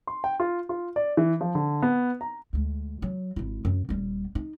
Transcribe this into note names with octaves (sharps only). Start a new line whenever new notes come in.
C6
G5
F4
F4
D5
E3
F3
D3
B3
A#5
D2 G#3
F#3
G#1 E4
F#2
D#1 G3
D#4